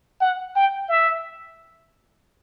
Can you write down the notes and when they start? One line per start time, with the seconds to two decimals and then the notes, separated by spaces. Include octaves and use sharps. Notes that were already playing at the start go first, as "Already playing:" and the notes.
0.21 F#5
0.56 G5
0.89 E5